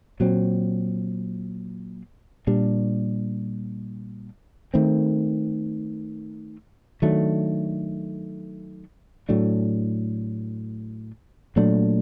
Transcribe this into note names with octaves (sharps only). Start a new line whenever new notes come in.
A#2 F#3 C4
A#2 G3 D4
D#3 A3 C4
D#3 F#3 A3 D4
A2 F#3 A3 D4
A#2 F#3 A3 D4